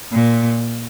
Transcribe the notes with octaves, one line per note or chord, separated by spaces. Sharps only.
A#2